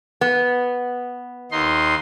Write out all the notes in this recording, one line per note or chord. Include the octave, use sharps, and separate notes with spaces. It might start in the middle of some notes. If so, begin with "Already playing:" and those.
B3
D#2 D#4 C6